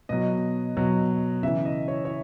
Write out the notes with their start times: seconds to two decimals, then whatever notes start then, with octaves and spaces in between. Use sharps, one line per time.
0.09 B2 F#3 D#5
0.77 B2 F#3
1.43 C#3 E3 E5
1.65 D#5
1.88 C#5
2.05 C#5